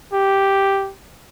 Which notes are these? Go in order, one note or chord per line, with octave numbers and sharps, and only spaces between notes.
G4